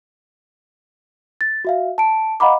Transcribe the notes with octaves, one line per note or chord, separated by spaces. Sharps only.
A6
F#4 E5 F5
A5 D7
D#5 F5 F#5 A#5 B5 D6